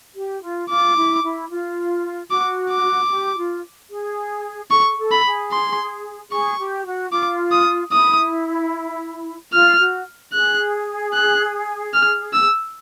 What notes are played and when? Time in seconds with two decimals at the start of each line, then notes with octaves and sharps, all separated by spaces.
0.16 G4
0.43 F4
0.70 F4 D6
0.97 E4
1.24 E4
1.50 F4
2.30 F#4 D6
2.70 D6
3.10 G4
3.37 F4
3.90 G#4
4.71 A4 C#6
4.98 A4
5.11 B5
5.24 G#4
5.51 C6
6.31 G#4 C#6
6.59 G4
6.85 F#4
7.12 F4 D6
7.51 D#6
7.92 E4 D#6
9.53 F4 F6
9.79 F#4
10.32 G#4 F#6
11.13 F#6
11.93 F6
12.33 E6